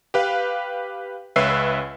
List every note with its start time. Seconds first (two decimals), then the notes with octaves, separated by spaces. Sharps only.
0.14 G4 B4 F5
1.36 C#2 C#4 B4 E5 E6 C7